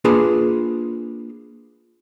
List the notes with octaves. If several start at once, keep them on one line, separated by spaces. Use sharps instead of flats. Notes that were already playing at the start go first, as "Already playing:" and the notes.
A#3 D4 F4 G#4 B4